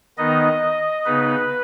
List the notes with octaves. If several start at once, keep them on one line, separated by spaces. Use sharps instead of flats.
D#3 B3 D#4 D#5
C#3 B3 D#4 B4